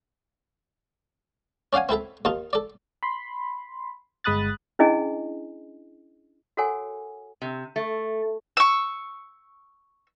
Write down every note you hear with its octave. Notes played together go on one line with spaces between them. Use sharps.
C#4 D5 F5 F#5 G#5
C4 E4 A4 E5
D#2 D#4 F4 A5
A4 D5
B5 C6
G1 G#3 B5 D#6 F#6 A6
C#4 D4 E4 G#4 D#5 G#5
F#4 A4 A#4 C#5 F#5 G#5
C3
A3
C#6 E6